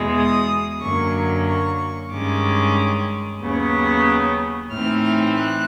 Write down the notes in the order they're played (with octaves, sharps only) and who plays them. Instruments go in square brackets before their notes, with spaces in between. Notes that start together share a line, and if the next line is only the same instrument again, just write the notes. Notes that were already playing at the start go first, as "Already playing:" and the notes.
Already playing: [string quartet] E2 B2 G#3
D#6
F#2 D3 F#3 A#3 C#6
C#6
G2 D#3 G#3 C#4 D6
D#2 C#3 F#3 B3
A2 E3 A3 C4 D#4 F6
F6
F#6